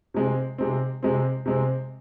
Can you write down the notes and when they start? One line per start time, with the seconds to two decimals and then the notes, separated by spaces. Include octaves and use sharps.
0.14 C3 G#3 C4
0.58 C3 G#3 C4
1.03 C3 G#3 C4
1.45 C3 G#3 C4